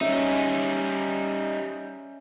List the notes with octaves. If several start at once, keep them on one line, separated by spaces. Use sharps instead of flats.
G3 C#4 D#4 E5